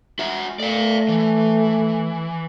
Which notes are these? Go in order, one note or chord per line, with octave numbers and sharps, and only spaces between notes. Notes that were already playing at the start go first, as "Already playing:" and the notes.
F#4 E5
A3 D5 F5
E3